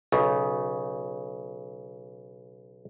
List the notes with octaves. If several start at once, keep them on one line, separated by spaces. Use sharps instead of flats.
B1 C#3